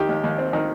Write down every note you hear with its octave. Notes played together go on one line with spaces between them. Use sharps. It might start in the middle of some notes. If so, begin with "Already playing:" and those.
Already playing: D#3 G4
D#2
D#2
C4
D#3